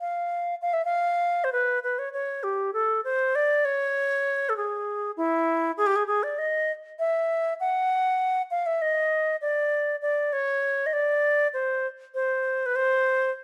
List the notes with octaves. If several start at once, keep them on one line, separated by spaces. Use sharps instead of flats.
F5
F5
E5
F5
C5
B4
B4
C#5
C#5
G4
A4
C5
D5
C#5
A4
G#4
E4
G#4
G4
G#4
G#4
D5
D#5
E5
F#5
F5
E5
D#5
D5
D5
C#5
D#5
D5
C5
C5
B4
C5